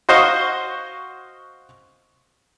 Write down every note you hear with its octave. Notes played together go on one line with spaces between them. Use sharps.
F#4 C5 D#5 F5 C#6